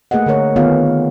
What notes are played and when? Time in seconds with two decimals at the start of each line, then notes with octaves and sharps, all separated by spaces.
0.11 A3 A#3 G#4 B4 D#5 F#5
0.26 D3 G#4 A#4 C#5
0.56 D#3 B3 F4 G#4 C#5 F5